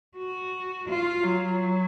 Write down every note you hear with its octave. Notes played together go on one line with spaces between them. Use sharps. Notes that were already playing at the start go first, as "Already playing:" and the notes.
F#4
F4
F#3